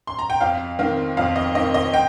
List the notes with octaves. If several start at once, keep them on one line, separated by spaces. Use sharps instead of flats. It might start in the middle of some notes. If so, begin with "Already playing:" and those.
C6
A#5
G5
F2 F5
D#3 C4 F5
F2 F5
D#5
D#3 C4 D#5
D#5
G5